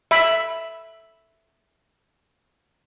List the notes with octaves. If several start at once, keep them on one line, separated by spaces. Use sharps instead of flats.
E5 B5